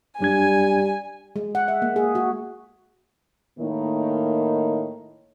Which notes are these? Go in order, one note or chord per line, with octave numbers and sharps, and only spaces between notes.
F#2 G3 D4 G#5 G#6
G#3
F#5
E5
A#3
G#4
F#4
A2 D#3 A#3 D#4